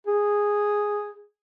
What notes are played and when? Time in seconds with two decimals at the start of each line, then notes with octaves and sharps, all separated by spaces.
0.07 G#4